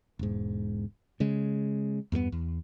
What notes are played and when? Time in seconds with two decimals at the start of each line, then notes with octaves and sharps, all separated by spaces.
0.19 E1 G#2
1.20 C#3 G#3
2.12 E2 G2 G3 B3
2.32 E2